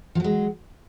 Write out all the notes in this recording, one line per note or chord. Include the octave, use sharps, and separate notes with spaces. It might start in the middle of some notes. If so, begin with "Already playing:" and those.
F3 F#3 G#3